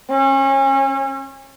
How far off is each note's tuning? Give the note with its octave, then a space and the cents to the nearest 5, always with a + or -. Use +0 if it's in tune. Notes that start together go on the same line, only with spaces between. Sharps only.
C#4 -35